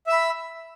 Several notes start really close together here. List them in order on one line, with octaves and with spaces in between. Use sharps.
E5 E6 B5